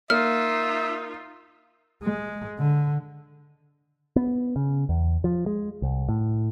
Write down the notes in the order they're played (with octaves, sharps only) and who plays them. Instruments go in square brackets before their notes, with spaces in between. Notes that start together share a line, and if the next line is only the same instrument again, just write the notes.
[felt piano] A#3 [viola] D#4 F4 [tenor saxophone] E5 [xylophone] F6
[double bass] G#3
D3
[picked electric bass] B3
C#3
E2
F3
G#3
C2
A2